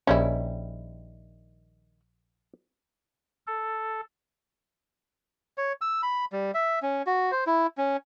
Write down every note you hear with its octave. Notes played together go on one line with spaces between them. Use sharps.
A#1 D#3 G3 C#4 E4
A4
C#5
E6
B5
G3
E5
C#4
F#4
C5
E4
C#4